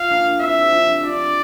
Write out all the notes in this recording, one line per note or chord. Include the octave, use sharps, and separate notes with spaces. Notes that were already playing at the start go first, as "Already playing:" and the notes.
Already playing: F4 F5
A#3 D4
C4 E4 E5
G4
D4 F4
D4 F4 D5